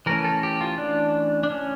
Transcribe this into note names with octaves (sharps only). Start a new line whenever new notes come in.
E3 A3 C#4 A#4
A4
G4
F4
D4
D4
C#4